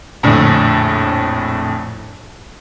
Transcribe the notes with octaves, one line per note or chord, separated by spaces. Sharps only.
A#1 F2 A2 D3